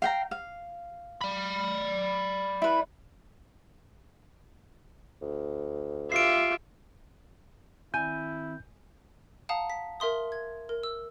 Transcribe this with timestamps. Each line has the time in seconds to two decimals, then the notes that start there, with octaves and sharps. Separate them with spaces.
0.02 F5 G5 A#5
0.31 F5
1.21 D5 B5
2.62 E4 B4
5.22 D2
6.12 F4 G4 E5 C7 D7
7.94 D#3 C4 E4 G#5 G6
9.49 F5 F#5 A5 A#5 D#6
9.70 B6
10.00 A#4 E5 C6 D#6
10.32 G#6
10.69 A#4
10.83 E6